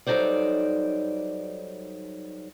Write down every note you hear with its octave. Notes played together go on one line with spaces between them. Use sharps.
F#3 G3 D#4 A4 C5 D5